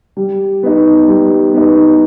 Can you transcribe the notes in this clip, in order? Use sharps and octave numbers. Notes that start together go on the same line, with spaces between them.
G3
B3 D#4
G3
B3 D#4